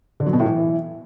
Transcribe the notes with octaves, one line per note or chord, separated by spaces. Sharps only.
D3
F#3
B2
A2
E3